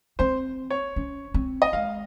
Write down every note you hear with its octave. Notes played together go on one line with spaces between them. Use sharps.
C4 C5
C#5
C#4
C4
D#5
G#3 F5